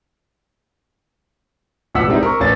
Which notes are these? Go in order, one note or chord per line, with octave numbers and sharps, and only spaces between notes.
A1 F2 B2 F#5 E6 B6
G3 G#3 C4 D#4 E4
A#4 C#6
A1 C#4 A6